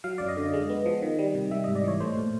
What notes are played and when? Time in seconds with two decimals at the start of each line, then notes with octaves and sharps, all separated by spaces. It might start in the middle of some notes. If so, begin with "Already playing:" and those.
0.04 F#3 F5
0.18 F#2 D5
0.28 D#5
0.37 D3
0.53 G#3
0.70 B3
0.86 F3
1.02 D#3
1.19 G3
1.35 C3
1.51 G3 E5
1.64 G#2 D#5
1.75 D5
1.84 E3 C#5
2.00 A3 C5
2.17 A#2